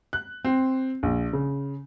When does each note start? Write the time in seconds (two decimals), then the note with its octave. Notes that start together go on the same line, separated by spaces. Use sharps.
0.13 F#6
0.45 C4
1.03 A#1
1.33 C#3